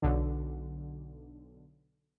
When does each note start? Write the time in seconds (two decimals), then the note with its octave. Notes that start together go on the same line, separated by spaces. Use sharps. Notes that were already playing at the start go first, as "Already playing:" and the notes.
0.02 B1 D3